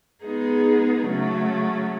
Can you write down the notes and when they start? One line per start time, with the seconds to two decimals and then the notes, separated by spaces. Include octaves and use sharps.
0.24 G#3 B3 D#4 G#4
1.06 C#3 F#3 A3 C#4